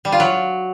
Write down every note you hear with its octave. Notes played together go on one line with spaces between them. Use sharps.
G3
F4
F#3